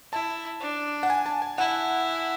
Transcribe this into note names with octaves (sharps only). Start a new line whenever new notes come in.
E4 A5
D4
F#5
G#5
A5
G#5
E4 F#5